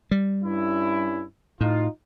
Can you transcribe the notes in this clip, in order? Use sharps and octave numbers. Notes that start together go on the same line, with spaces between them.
G3
G2 C#4 E4
A2 D#4 F4